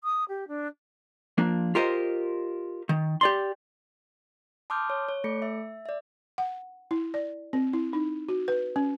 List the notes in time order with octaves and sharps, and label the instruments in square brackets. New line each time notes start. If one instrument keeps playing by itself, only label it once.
[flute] D#6
G4
D4
[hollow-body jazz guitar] F3 A#3 D4
F4 G4 A#4 C5 D#5
D#3
G4 D5 C6
[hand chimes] A5 C6 D6 D#6 F6 G6
C#5
C#5
A3 A4 C#7
E5
D5 E5
[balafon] F#5
E4
D5
C4
E4
D#4
F#4
B4
C#4